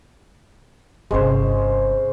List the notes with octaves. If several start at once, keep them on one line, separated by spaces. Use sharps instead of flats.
G1 C3 G#3 C#4 C5